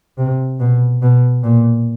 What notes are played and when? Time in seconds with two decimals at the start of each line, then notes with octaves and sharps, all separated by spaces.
0.17 C3
0.59 B2
1.02 B2
1.43 A#2